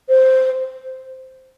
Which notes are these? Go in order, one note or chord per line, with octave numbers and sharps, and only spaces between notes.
C5